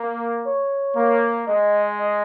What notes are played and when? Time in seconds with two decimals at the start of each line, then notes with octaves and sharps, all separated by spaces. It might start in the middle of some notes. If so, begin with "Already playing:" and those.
Already playing: A#3
0.45 C#5
0.96 A#3
1.47 G#3 D#5
1.99 D#5